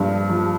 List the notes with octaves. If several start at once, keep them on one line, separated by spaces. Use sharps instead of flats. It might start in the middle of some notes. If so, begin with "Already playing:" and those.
Already playing: G2 F3
F3